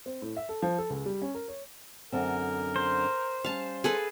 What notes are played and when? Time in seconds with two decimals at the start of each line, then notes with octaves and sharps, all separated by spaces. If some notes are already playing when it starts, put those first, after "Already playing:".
0.06 C4
0.22 A2
0.37 E5
0.49 A4
0.62 F3
0.78 A4
0.90 C#2
1.06 G3
1.22 C#4
1.35 A#4
1.48 C#5
2.12 F#2 D3 C4 A#4
2.76 C5
3.45 G3 C#4 F5 A5
3.84 G#4 A4 B4